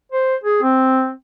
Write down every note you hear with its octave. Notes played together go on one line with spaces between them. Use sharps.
C5
G#4
C4